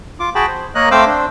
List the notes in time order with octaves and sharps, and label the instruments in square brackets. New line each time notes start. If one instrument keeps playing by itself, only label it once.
[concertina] F4 D6
F#4 G#4 G5 A5 B5
C5
A#3 A#4 C#5 D#5 F#6
A3 C4 C5 F5 D6 E6
D4 C5